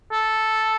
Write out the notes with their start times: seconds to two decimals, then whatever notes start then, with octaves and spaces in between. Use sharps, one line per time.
0.12 A4